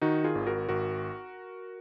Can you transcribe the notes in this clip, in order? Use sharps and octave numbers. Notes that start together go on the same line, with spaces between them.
D#3 D#4 F#4
F4 G#4
G#1
F#4 A#4
G#1 F#4 A#4